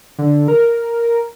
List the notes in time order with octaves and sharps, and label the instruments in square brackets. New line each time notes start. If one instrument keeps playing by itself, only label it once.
[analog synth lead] D3
A#4